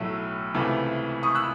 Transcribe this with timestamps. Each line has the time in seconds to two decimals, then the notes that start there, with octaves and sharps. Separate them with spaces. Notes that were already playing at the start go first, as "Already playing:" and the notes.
Already playing: B1 A2 F#3 A3 E6
0.54 C#2 C3 E3 A3
1.23 C#6 D#6
1.35 E6 F#6